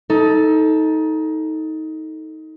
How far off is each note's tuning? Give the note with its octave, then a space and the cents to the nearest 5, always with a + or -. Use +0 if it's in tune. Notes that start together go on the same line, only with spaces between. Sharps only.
D#4 +20 A4 +0